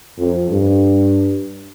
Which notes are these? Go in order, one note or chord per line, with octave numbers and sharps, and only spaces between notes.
F2
G2